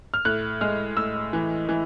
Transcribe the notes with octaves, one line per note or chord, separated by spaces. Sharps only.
F6
A2 F#6
G#3 F6
A2 E6
E3
E3